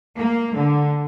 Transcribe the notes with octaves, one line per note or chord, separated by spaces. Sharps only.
A#3
D3